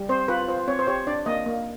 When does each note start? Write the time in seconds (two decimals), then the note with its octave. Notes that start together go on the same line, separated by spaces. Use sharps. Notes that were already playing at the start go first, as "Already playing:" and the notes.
Already playing: G3
0.09 C4 C5
0.28 F4 B4
0.48 F4 C5
0.68 C4 C#5
0.79 C5
0.87 G4 C#5
1.07 D4 D5
1.26 A#3 D#5
1.46 A#3